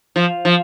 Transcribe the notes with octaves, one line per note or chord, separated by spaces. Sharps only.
F3
F3